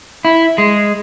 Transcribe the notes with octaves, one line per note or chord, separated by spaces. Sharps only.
E4
G#3